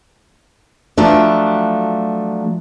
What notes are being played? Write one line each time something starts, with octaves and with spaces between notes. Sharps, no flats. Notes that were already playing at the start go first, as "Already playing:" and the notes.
F3 F#3 A3 D4